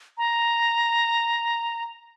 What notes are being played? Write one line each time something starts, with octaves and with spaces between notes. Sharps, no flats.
A#5